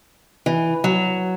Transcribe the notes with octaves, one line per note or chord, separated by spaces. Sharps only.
E3
F#3